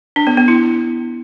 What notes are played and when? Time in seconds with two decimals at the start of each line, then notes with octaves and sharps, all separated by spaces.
0.16 D4
0.27 B3
0.37 B3
0.48 E4